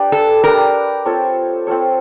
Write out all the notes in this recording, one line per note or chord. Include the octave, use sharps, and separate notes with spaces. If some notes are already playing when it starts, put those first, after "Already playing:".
Already playing: D4 G4 B4 D5
A4
D4 G4 A#4 B4 D5
C4 F4 A4 C#5
C4 F4 A4 C#5